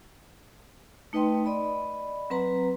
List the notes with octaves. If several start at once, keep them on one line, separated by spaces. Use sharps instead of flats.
A3 D#4 B4 D#5 G5 C6
D5 D#5 B5
F#3 C4 B4 A#5